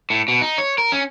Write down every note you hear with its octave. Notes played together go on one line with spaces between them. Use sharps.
A2
B2
D#4
C#5
A#4
C#4